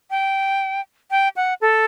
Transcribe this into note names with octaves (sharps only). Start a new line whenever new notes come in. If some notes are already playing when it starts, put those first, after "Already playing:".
G5
G5
F#5
A4